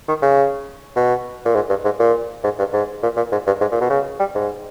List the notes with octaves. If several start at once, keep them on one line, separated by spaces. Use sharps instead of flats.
D#3
C#3
B2
A#2
G#2
G2
G#2
A#2
G#2
G2
G#2
A#2
A#2
G#2
G2
G#2
A#2
B2
C#3
G3
G#2